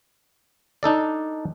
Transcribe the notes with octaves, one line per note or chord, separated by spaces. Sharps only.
D4 D#4 A4 D5